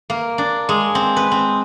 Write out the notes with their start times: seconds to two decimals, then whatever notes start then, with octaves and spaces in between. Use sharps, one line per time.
0.10 A#3
0.38 D4
0.69 G#3
0.95 C4
1.16 B4
1.32 C4